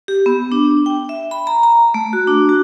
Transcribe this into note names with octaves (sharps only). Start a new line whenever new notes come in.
G4
B3
D4
G5
E5
B5
A#5
A#5
A3
F#4
D4
F#4